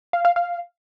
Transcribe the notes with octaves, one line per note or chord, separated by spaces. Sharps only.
F5
F5
F5